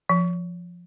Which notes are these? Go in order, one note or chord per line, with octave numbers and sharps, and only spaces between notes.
F3